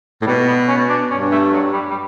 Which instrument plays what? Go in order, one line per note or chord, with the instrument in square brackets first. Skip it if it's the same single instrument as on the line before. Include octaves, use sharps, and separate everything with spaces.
[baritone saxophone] A2
[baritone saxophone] B2 [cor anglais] G3
[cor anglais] B3
C#4
D4
[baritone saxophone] G2 [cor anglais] C#4
[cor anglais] A3
F#3
G3
G3